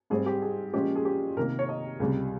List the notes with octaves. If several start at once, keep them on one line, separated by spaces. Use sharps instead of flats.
G#2 G3 C4 G#4
G4
G#4
A#2 F3 G#3 C#4 G4
G#4
G4
C3 D#3 A#3 A#4
C#5
D#5
C#2 C3 G3